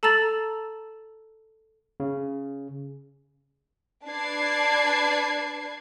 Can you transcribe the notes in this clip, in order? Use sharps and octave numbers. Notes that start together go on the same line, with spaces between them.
A4 A5 A#5 E6 A6 F#7
C#3
D4 B4 D5 A5 G#6 C7